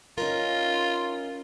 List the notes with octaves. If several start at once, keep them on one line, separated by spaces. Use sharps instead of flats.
C#4 D#4 F4 A#4